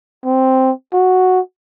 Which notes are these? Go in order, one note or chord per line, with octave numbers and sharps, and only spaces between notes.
C4
F#4